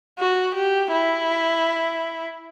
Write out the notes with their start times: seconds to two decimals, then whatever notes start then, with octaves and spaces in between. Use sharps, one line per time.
0.18 F#4
0.54 G4
0.92 E4